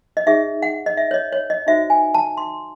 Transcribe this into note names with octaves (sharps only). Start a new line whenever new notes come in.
D#5
D#4 G#4 C#5 E5
F#5
D#5
E5
C#5
D#5
C#5
D#5
D#4 F#4 C5 E5
G#5
A5
C6